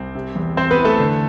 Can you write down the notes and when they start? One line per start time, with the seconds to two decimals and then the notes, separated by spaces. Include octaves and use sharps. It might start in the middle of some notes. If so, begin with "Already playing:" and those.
Already playing: C2 C4
0.15 C3
0.35 E2
0.57 E2 C4 C5
0.71 B3 B4
0.78 E3
0.85 A3 A4
1.00 D3